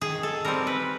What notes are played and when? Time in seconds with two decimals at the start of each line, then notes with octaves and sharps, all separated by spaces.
0.01 D#3 G#4
0.23 A4
0.45 G3 C4 A#4
0.67 B4